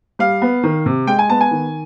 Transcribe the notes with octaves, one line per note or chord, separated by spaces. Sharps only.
G3 F5
B3
D#3
C3
G#3 G5
G#5
B3 A5
G#5
D#3